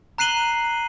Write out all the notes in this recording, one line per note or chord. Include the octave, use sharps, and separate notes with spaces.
A#5 F#6 C7 D#7 F#7 G7